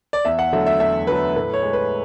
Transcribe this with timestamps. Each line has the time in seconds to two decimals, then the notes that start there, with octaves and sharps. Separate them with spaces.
0.13 D5
0.25 E2 E5
0.39 F#5
0.52 D3 F#3 A3 E5
0.66 E5
0.80 E2 E5
1.07 D3 F#3 A3 B4
1.35 A2 B4
1.53 C#5
1.63 G#3
1.73 B4